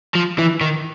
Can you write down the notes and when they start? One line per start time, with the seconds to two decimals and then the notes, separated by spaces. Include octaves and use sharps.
0.15 F3
0.39 E3
0.61 D#3